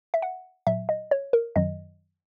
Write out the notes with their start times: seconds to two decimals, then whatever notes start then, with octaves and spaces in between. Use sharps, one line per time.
0.14 E5
0.22 F#5
0.67 A#2 F#3 E5
0.89 D#5
1.11 C#5
1.33 A#4
1.56 F#2 D#3 F#3 D#5